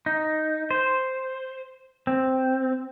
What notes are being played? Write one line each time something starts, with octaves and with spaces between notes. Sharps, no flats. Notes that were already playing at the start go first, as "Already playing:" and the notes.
D#4
C5
C4